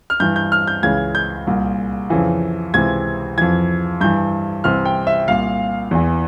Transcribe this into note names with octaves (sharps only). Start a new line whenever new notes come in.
F6
G2 E3 G6
G6
F6
G6
C#2 C#3 E3 G#6
G6
C2 A#2
F2 C#3 E3
C#2 C3 E3 G#6
F2 E3 G#6
G2 E3 G6
C2 C3 E3 F6
G5
E5
C2 A#2 F5
E2 E3